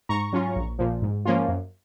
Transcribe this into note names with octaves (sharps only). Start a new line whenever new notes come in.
G#2 A#5 C#6
F#3 C#4 F4
A#1
A#2 F3
G#2
F3 A#3 C#4 F4
F#2